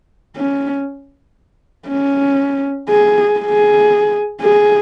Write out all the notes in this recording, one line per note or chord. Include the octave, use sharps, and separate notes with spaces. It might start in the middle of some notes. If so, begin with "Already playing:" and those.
C#4
C#4
G#4
G#4
G#4